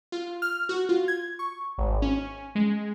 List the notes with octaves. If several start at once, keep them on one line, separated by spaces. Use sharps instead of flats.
F4
F6
F#4
F4
G#6
C#6
G#1
C#4
G#3